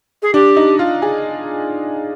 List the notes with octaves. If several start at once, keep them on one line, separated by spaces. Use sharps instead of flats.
G#4
D4 G4
D#4
F4
G#4